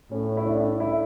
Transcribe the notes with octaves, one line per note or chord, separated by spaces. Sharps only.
A2 C#4
E4
D4
E4